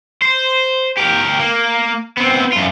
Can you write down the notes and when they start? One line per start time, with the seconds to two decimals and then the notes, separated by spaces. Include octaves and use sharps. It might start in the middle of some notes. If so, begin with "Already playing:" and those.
0.22 C5
0.97 G4 A#4
1.39 A#3
2.17 B3 C4
2.52 F#2 F4